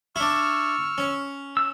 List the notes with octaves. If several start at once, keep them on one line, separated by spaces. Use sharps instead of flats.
D4 E4 C#6 E6 F6
C#4
E6